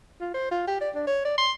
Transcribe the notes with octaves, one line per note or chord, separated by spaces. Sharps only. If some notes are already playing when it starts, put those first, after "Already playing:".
F4
C5
F4
G4
D5
D4
C#5
D5
C6